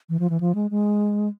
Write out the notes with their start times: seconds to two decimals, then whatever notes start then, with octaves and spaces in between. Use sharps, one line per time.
0.09 E3
0.19 F3
0.30 E3
0.40 F3
0.55 G#3
0.71 G#3